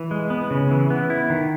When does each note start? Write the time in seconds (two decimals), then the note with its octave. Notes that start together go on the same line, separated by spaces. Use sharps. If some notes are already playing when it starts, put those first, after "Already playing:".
Already playing: E3
0.11 G#3
0.30 B3
0.51 C#3
0.71 E3
0.90 B3
1.10 E4
1.30 D#3